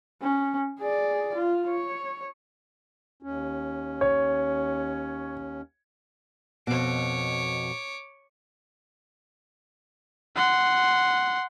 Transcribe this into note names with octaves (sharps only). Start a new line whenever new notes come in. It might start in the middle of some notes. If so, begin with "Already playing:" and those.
C#4
G#4 D5
F4
C#5
D#2 C#4
C#5
F2 B2 C#5 D6
F#5 C6